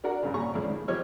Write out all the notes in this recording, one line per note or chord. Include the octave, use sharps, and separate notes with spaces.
D4 F#4 A#4 D5 F#5 A#5
G2 C#3
A#2 C#3 A#5 C#6
C#2 F3 A3 D5
D#3
F3 C4 G4 C#5 D#5 F6